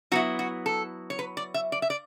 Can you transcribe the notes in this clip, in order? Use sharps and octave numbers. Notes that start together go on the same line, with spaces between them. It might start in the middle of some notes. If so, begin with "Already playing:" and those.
F#3 B3 E4 F#4
F#4
A4
C#5
B4
D5
E5
D5
E5
D5